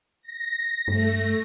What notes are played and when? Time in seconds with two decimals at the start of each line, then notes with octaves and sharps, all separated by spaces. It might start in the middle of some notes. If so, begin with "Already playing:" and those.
0.23 A#6
0.88 G2 A3